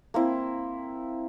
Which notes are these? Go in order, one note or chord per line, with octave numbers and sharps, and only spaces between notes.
A#3 C4 E4